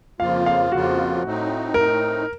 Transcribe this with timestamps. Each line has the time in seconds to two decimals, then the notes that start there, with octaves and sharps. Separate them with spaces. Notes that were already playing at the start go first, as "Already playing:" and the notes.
0.20 F2 C#3 F3 A#3 F4 F5
0.46 F5
0.72 F2 C#3 F3 A#3 F4 F#4
1.24 A2 A3 C4 D#4
1.74 A2 A3 C4 D#4 A#4